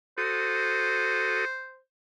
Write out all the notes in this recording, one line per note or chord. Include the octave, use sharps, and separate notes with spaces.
F#4 A4 C5 D#6